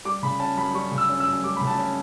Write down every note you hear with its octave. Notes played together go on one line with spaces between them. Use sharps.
G3 D6
C#3 B5
C#4 A5
F#2 B5
G3 C#6
C#3
E6
C#4
E6
F#2
G3 D6
C#3 B5
A5
C#4